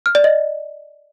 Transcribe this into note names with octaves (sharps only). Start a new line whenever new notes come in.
F6
D5
D#5